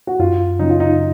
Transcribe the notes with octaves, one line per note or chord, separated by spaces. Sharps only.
F#4
F#2 F4
C#3 F#3 C#4 D#4
F4
D#4